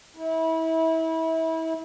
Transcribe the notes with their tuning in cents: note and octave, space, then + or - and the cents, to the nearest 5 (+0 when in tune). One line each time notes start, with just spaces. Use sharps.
E4 -30